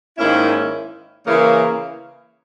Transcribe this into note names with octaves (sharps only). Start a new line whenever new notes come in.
G#2 D#3 A#3 C#4 E4
C#3 E3 A#3 E4